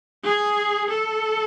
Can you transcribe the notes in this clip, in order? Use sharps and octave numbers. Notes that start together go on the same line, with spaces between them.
G#4
A4